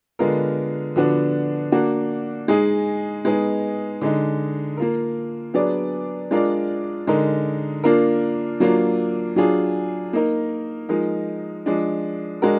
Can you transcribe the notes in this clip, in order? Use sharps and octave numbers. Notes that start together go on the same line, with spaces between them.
D3 G#3 B3 F4 A#4
D3 F3 B3 D4 F#4
A#3 D4 F#4
G#3 D#4 G#4
G#3 B3 D#4 G#4
D3 G#3 D#4
A#3 F4 A#4
F#3 B3 D4 G#4 D5
G#3 D4 F4 A#4 D5
D3 G#3 D#4 A#4
A#3 D4 F4 A#4
F#3 A#3 D4 F4
F#3 D4 F4 G#4
A#3 D#4 A#4
F3 G#3 D#4 A#4
F3 G#3 D4
G#3 D4 F#4 A#4